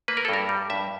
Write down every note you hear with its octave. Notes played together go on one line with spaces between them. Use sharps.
A#3 B4
A#4
A4
G2 A#4
G3
G2 E5